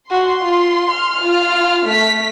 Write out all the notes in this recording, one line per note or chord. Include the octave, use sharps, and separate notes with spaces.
F#4 C6
F4
F6
F4
A3 B6